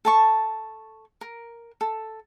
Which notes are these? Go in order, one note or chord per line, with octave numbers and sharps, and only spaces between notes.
A4 A5 C#6
A#4
A4